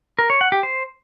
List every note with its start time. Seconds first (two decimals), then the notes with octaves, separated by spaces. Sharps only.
0.19 A#4
0.30 C#5
0.41 F#5
0.52 G4
0.63 C5